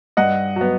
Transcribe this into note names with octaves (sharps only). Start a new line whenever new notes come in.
G2 D#5 F#5
F#3 B3